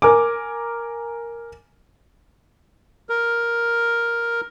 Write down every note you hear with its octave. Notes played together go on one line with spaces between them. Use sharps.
A#4 G#5 D6
A#4